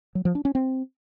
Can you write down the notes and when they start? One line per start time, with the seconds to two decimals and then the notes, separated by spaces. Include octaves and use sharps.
0.15 F#3
0.25 F3
0.35 D4
0.45 C#4
0.55 C4